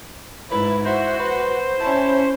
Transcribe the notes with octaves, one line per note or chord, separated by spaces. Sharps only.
G#2 E4 B4
E4 F#4 C5
B4
C#4 E4 A5